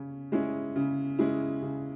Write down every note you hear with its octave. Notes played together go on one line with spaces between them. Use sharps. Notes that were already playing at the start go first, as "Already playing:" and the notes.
Already playing: C#3 C#4
G#3 C#4 E4
C#3
G#3 C#4 E4
C#3